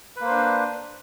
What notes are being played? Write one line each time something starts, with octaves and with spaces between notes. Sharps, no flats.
A#3 D4 B4 C5